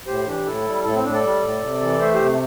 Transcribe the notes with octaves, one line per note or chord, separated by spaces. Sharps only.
A2 G4 C5
E3 D4 G4
A2 E4 A4
G3
A2 E4 A4
C4
A2 D4
A4 D5
G3
A2
C3
E3
A3 C5 E5
G4 C5
C3